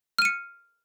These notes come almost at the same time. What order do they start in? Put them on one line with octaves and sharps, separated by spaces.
F6 D#7 C#7